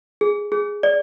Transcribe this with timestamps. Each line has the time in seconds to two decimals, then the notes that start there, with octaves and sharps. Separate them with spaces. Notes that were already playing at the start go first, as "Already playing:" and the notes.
0.21 G#4
0.52 G#4
0.83 D5